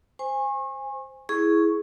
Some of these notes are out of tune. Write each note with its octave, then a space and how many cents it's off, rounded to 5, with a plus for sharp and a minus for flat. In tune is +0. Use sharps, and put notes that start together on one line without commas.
C5 +0 G#5 -20 C#6 -35
E4 +0 G#4 +5 C#6 +0